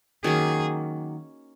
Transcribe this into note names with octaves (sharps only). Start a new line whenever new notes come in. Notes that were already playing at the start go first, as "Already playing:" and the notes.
D#3 F#3 A#3 C#4 G#4